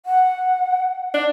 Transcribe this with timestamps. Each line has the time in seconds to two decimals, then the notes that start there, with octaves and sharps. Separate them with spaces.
0.06 F#5
1.14 D4